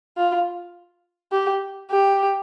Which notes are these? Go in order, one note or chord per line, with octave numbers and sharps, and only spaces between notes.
F4
G4
G4